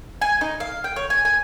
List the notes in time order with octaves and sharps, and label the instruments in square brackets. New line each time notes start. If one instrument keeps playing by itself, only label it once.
[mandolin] G#5
D#4
F5
G5
C#5
G#5
G#5